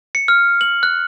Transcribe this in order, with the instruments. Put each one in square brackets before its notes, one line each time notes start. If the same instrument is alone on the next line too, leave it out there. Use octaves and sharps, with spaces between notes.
[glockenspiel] C#7
F6
F#7
F#6